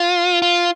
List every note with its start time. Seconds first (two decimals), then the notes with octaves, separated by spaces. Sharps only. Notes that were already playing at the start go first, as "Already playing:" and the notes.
Already playing: F4
0.42 F4